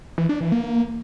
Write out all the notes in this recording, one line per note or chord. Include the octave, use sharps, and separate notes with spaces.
E3
D4
E3
A#3